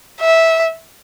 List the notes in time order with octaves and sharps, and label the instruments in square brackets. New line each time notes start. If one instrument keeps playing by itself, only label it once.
[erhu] E5